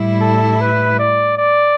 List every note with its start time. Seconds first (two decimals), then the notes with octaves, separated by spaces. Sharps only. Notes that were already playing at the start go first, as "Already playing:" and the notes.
Already playing: A2 G3 E4
0.21 A4
0.61 B4
0.99 D5
1.38 D5